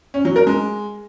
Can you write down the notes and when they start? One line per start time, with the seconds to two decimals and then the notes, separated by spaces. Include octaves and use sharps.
0.14 C#4
0.25 F#3
0.36 A#4
0.47 G#3